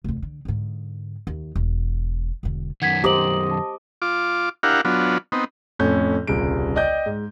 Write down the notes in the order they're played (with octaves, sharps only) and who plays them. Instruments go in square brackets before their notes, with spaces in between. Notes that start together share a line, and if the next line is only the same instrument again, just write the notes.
[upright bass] F1 E2
D3
G#2 D3
D#2
E1
E1 D3
[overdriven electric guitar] F#2 D#3 [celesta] F#5 G#6 B6
[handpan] G4 C5 [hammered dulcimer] D#5 D6 [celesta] A#5 F#7
[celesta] A5
[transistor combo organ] F4 D6
D4 E4 G4 A#4 F5 F#5
F#3 B3 D4 F4
B3 C4 D#4
[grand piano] F2 A2 C#4 G6
D#1 C2 C#3 D7
D5 D#5 G5 G6
G#2